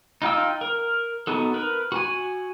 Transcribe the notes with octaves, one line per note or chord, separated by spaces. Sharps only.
D#4 F4 G5 E6
A#4
B3 D#4 F#4 A4
A#4 B4
F#4 G#5